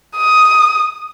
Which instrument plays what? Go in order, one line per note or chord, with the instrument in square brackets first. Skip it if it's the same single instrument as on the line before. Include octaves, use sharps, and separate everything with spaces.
[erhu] D#6